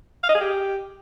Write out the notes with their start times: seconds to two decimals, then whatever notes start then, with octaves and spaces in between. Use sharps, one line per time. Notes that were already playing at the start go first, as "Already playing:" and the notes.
0.24 F5
0.29 D#5
0.35 G#4
0.41 G4